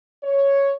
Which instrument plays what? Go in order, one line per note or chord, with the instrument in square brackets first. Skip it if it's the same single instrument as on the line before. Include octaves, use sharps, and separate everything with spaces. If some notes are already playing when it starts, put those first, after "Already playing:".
[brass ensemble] C#5